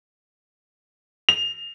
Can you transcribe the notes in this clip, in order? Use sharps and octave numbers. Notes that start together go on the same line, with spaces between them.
F7